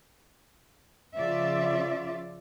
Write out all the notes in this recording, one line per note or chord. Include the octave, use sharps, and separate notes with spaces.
C#3 F3 F4 D5 E5